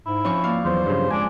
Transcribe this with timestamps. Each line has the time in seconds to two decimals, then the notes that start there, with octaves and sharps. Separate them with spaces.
0.06 G#2 E4
0.25 F2 F3 C#4 C#6
0.44 A#3 D5 F5
0.65 E2 F#3 C5
0.86 G2 C#3
1.11 G#3 D4 G#5